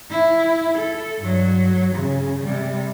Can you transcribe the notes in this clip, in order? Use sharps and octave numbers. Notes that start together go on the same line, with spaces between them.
E4
A4
G2 F#3
C#3
C3 G3